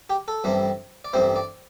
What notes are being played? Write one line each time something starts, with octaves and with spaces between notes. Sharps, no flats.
G4
A4
A1 G2 G3 C4 E4
D5
A1 G2 G3 C4 E4 C5
D5